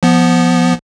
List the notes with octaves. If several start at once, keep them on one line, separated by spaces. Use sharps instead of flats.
F3 B3